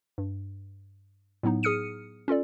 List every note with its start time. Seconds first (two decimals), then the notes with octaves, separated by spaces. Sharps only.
0.18 G2
1.43 A2 F#3 B3 D#4
1.63 G#4 D#6 F6 C#7 D#7
2.28 C#4 F4 A4 D5